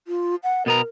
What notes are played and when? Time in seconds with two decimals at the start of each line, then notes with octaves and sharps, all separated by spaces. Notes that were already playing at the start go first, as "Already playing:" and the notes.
0.08 F4
0.43 F#5
0.66 B2 B3 A#4 A#5